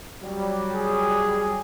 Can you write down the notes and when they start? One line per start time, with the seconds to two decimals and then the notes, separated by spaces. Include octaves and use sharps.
0.22 F#3 G3
0.74 G#4